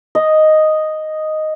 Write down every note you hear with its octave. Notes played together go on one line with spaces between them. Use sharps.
D#5